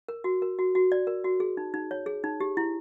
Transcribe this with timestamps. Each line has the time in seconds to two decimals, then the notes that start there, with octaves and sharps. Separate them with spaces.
0.08 A#4
0.24 F#4
0.42 A#4
0.59 F#4
0.75 F#4
0.92 D5
1.07 A#4
1.24 F#4
1.40 G#4
1.57 D#4
1.74 D#4
1.91 C#5
2.06 G#4
2.24 D#4
2.40 G4
2.57 E4